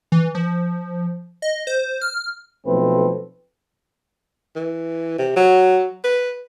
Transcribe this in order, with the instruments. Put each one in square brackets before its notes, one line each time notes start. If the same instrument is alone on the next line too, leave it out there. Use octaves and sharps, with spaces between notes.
[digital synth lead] E3
F3
D#5
C5
F6
[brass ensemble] B1 F3 A3 C4 A4 B4
[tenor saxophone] E3
C3
F#3
B4